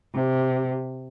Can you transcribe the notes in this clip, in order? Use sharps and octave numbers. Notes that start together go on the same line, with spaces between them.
C3